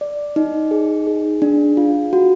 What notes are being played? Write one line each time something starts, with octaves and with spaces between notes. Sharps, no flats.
D5
D#4
G#4
G#4
D4
F4
F#4